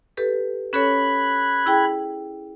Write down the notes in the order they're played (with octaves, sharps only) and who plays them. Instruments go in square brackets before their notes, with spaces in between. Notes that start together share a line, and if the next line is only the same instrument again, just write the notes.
[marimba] G4 A4 B4
[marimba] C#4 A4 C#5 [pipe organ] B5 F#6 G#6
[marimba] E4 G#4 G5